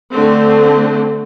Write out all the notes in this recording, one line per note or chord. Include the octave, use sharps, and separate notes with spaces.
D3 A3 C4